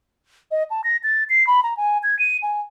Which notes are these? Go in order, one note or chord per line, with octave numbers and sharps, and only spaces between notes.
D#5
A5
A#6
A6
C7
B5
A#5
G#5
G#6
D#7
G#5